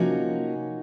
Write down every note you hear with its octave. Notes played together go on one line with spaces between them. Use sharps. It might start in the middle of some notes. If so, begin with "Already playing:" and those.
Already playing: C3 F3 A#3 C#4 D#4 F#4